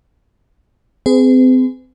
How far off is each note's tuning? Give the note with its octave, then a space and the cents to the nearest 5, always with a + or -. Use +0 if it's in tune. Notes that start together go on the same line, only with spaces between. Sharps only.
C4 -30 G#4 +0 B4 +45